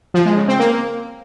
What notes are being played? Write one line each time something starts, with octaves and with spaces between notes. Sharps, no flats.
F3
G#3
C#3
C4
A#3